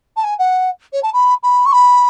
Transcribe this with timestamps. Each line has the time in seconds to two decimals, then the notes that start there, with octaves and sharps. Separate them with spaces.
0.16 A5
0.24 G#5
0.39 F#5
0.93 C#5
1.03 A5
1.13 B5
1.43 B5
1.66 C#6
1.72 B5